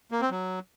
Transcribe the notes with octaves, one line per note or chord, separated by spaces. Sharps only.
A#3
C4
F#3